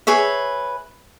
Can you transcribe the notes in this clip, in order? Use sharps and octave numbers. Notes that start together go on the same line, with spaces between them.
G#4 B4 C#5 E5